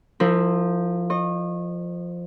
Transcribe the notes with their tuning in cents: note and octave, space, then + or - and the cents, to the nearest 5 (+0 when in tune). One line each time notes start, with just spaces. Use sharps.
F3 +0 E4 -25 A#4 -35
D#5 -25 C#6 -35